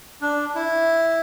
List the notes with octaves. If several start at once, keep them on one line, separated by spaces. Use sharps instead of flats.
D4
E4